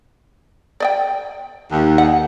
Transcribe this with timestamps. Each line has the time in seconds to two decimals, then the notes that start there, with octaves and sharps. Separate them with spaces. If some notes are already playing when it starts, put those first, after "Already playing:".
0.80 D5 D#5 G5
1.71 D#2
1.98 F#5